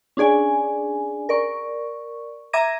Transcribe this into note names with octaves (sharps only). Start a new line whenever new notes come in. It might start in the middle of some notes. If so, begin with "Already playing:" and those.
C#4 D4 G#4 D5 G#5
A#4 D5 C#6
E5 A#5 D6 G#6 A#6 D#7